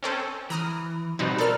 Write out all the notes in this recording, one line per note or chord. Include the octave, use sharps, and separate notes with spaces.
C4 C#4 A4
E3 A#5 D#6 F6
B2 G3 C4 D#4 F#4 B4
A4 A#4 D5 A#5 F6